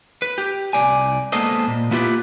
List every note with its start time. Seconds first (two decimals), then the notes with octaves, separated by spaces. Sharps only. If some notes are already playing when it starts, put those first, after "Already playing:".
0.22 B4
0.38 G4
0.73 C2 D5 G#5
1.32 G#3 A#3 B3 A4 C5 D#5
1.67 A#2
1.91 A#3 B3 E4 F4 G4 B4